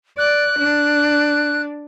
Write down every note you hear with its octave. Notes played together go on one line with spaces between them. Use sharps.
D5 F#6
D4